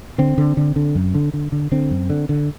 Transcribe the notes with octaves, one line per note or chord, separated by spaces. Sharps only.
D3 C4
D3
D3
D3
F#2
D3
D3
D3
D3 C4
F#2
D3
D3